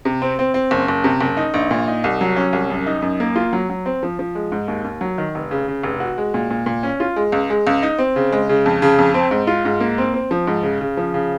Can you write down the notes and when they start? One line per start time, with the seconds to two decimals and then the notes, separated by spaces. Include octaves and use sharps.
0.05 C3
0.22 C4
0.39 C4
0.54 C4
0.71 F#1
0.88 F#1
1.04 C3
1.20 F#1
1.37 D#4
1.54 A#1
1.71 A#2
1.88 D#4
2.04 C2
2.21 F#3
2.36 C#4
2.53 C2
2.70 F#2
2.86 D#4
3.02 F#2
3.20 A#3
3.36 F4
3.53 F#3
3.70 F#3
3.86 C4
4.03 F3
4.19 F3
4.35 G#3
4.52 G#2
4.68 D#2
4.84 D#2
5.01 F#3
5.18 D#3
5.35 F1
5.51 C#3
5.68 C#3
5.84 F1
6.00 F#4
6.18 G#3
6.34 A#2
6.50 A#2
6.66 A#2
6.83 C#4
7.00 F4
7.16 G#3
7.32 C#2
7.50 G#3
7.67 C#2
7.83 D#4
7.99 C4
8.16 C#3
8.32 G#3
8.49 C#3
8.66 F2
8.82 C#3
8.98 F2
9.14 C4
9.31 G#2
9.47 F4
9.65 G#2
9.80 A#3
9.98 C4
10.14 C4
10.31 F3
10.47 G#2
10.63 C#3
10.81 C#3
10.97 F3
11.14 C#3